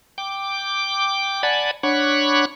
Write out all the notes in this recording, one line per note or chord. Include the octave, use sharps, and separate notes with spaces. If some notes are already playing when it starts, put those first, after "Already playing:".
G5 D6
D5 F#5 G#5 A5 B5
D4 C#5 F#5 B5 C#6